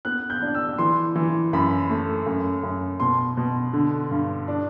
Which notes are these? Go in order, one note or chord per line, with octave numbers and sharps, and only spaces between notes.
B3 F#6
G6
D4
E6
E3 C6
E3
F#2 B5
A3
F#2
F#2
B2 C6
B2
D3
G2
D4